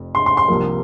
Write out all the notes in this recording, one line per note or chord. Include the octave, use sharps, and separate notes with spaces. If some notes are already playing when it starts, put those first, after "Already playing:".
Already playing: F1 F2
C6
C6
C6
C2 C3 F3 A#3